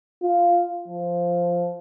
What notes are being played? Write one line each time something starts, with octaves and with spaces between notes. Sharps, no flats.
F4
F3